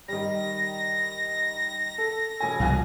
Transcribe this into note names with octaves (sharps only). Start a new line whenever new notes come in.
D#3 G3 A#6
A4
E1 G#5
C2 B2 F3 F5 G#5